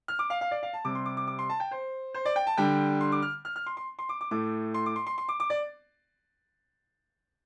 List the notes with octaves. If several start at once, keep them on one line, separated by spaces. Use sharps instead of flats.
F6
D6
F5
F5
D5
F5
A5
C3 G3 D6
C6
D6
D6
D6
C6
A5
G5
C5
C5
D5
G5
A5
D3 G3 G5
C6
D6
F6
F6
F6
C6
C6
C6
D6
D6
A2 A3 D6
C6
D6
C6
C6
C6
D6
D6
D5